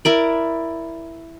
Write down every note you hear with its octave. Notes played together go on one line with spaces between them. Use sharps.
E4 A#4 D5